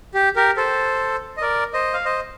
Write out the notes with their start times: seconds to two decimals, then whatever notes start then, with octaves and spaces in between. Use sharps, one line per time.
0.14 G4
0.36 G4 A#4
0.57 A4 C5
1.37 D#5
1.42 A#4 D5
1.73 C5 D#5
1.94 F5
2.05 C5 D#5